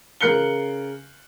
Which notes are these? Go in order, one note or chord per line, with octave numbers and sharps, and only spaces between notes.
C#3 A#4 F#6 C7 C#7 G7